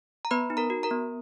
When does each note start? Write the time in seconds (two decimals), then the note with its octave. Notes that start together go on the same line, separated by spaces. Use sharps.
0.25 A#5
0.31 B3 B4 B5
0.50 D#4
0.57 A#4 A#5
0.70 F#4
0.83 A#4 A#5
0.91 B3